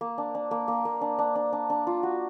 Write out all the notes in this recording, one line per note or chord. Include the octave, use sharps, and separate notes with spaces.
A#3
D4
D4
A#3
A#3
A#3
D4
D4
D4
D4
D4
F4
F#4